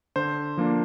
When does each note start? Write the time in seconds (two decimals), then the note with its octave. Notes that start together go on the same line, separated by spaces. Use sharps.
0.16 D3 C5
0.57 F3 A#3 D4